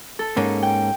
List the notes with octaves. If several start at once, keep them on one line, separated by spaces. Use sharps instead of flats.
A4
G#2 A#3 C#4
G5